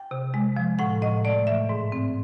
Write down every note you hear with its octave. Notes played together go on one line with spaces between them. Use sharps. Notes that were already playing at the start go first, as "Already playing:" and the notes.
Already playing: G5
C3
G#3
F3
A2 F#5
A2 D#5
A3 D5
E3 E5
G#2
C4